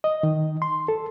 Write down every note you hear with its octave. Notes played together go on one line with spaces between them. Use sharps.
D#5
D#3
C6
A4